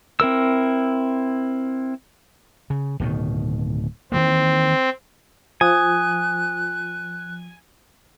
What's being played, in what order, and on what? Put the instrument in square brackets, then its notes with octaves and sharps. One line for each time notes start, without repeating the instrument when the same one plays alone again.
[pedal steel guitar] C4 E4 A#4 E6
[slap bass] C#3
D1 B2 D#3
[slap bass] D#3 E3 A#3 [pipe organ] C4
[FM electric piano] F3 [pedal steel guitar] G#5 [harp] D#6 [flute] F#6